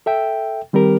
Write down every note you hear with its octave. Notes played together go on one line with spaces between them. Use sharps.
A4 E5 G5
D#3 G3 C4 G4 A#4